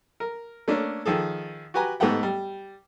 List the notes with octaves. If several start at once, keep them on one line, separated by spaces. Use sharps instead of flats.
A#4
A3 A#3 C#4 D4
D#3 F3 G#4 A4
F#4 G4 B4 G#5 A#5
G#2 A3 B3 G4 F#5 G5
G3